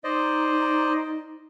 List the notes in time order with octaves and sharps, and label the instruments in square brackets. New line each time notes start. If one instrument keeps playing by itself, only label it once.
[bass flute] D#4 [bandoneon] C5 D5 D#5